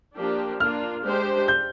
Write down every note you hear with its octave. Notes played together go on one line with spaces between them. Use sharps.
F3 A#3 D4 G4
A#3 D4 F4 F6
G#3 D4 G4 C5
G6